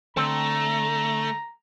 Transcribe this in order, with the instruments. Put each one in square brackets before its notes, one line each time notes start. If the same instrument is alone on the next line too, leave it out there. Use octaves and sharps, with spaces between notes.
[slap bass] D3 [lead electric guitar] A3 [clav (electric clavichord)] C4 [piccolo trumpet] A#5